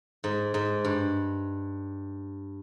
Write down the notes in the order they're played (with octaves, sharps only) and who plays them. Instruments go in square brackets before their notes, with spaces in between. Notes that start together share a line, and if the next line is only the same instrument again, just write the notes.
[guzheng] G#2
G#2
G2